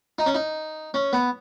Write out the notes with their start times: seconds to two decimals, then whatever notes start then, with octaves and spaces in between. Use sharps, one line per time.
0.19 D#4
0.26 C#4
0.35 D#4
0.94 C#4
1.13 B3